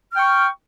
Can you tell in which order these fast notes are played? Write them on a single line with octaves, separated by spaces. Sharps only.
F6 G5 C#6